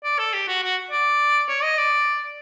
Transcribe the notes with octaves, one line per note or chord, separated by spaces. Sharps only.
D5
A4
G4
F#4
F#4
D5
C#5
D#5
D5